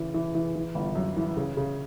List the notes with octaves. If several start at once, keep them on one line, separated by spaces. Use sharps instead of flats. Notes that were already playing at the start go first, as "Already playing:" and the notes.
Already playing: C#3 E3
E3
E3
E3
G1
F#2
E3
C#3
C#3